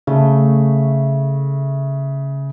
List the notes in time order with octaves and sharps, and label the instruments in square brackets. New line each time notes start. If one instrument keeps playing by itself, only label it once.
[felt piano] C#3 [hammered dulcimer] A3